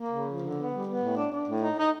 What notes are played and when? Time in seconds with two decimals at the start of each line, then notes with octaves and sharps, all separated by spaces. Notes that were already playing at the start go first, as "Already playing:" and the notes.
Already playing: A#3
0.09 C#3
0.24 F3
0.41 D3
0.56 B3
0.71 G3
0.86 B3
1.01 A2
1.16 D4
1.32 D4
1.47 A2
1.63 D#4
1.78 D#4